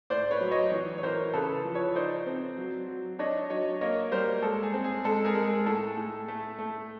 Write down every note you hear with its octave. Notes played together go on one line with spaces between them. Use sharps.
A2 C5 D5
B4 C#5
F#3
C#5 D#5
E3
C#5
E3 A#4 C5
C#3 A4 B4
F3
B4 C#5
D#4 C5 D5
C4
F#3
F#3
D4 C#5 D#5
F#3 C#5 D#5
A#3 C#5 D#5
G3 A#4 C5
G#3 A4
G#4
C4
G#4
G#3 A4
G#4 A#4
G#3
G#4
A2 A4
A2
A3
A3